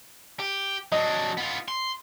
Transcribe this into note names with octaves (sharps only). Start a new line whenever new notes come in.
G4
F#3 D4 D#5
B3 F4
C6